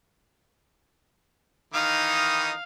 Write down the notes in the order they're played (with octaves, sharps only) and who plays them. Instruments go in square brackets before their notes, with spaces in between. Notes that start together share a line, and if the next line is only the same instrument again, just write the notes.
[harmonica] D#3 E3 D#6 [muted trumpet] D#4 [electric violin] F5